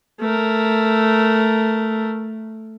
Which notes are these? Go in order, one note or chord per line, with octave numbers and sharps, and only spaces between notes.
A3 A#4